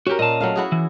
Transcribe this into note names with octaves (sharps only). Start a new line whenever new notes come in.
C#4 F#4 G4 A#4
A#2 D#5 F5 A5
F#3 A3 F5
E4 F#4 G#4
E3